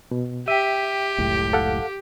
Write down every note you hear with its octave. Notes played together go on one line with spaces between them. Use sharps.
B2
G4 E5 G5 B6 D#7
F#1 C#2 A2
A4 F5 F#5